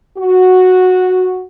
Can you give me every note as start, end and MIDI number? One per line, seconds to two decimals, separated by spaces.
0.18 1.44 66